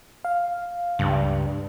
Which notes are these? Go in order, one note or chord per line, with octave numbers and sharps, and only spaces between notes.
F5
C#2 G2